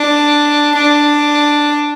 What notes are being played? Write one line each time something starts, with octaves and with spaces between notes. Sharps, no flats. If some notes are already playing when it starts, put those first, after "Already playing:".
Already playing: D4
D4